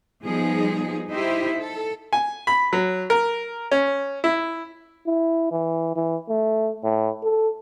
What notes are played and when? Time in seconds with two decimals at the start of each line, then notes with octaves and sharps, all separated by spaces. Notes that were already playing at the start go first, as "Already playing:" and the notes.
0.24 F3 G3 B3 D#4 G#4
1.10 D#4 E4 G4 C5 E5
1.59 A4
2.13 G#5
2.47 B5
2.73 F#3
3.10 A#4
3.72 C#4
4.24 E4
5.07 E4
5.52 E3
5.96 E3
6.29 A3
6.84 A2
7.23 A4